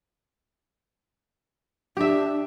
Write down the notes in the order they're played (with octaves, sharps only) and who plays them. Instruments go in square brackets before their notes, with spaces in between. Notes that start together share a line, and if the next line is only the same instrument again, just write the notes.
[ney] D4 [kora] G4 E5